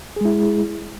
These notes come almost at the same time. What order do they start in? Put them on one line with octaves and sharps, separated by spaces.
G#4 G#3 E4